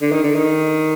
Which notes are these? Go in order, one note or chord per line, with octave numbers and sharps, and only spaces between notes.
D3
D#3
D3
D#3